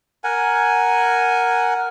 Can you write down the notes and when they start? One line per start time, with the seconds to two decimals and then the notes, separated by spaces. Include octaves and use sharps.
0.24 A#4 F#5 G#5